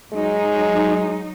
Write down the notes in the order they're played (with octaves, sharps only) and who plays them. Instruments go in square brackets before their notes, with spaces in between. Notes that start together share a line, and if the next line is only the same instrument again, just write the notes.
[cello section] F#3 D#4 [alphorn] G#3